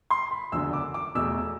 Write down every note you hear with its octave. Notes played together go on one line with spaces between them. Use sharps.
C6
B5
F#1 E2 D3 F#3 E6
D6
D6
E1 E2 B2 A3 E6